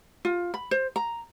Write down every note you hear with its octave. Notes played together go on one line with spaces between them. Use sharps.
F4
B5
C5
A#5